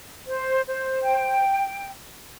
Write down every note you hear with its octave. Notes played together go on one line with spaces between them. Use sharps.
C5
C5
G5